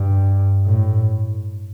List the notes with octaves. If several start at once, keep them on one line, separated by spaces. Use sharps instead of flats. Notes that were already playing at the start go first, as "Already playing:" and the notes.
Already playing: G2
A2